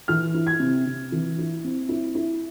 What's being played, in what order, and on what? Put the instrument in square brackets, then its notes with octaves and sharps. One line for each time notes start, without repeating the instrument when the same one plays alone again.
[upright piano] E3 F6
E4
G#6
C3
C3
E3
E4
C4
E4
E4